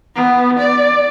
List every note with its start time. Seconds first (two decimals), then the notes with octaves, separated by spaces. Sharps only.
0.15 B3
0.59 D5